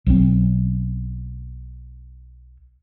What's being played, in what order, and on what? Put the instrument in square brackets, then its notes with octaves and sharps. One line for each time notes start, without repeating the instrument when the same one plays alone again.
[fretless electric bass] B1 F#3 G3 C4